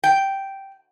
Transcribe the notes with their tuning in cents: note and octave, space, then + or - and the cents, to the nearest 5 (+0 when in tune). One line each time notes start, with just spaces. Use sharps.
G5 -5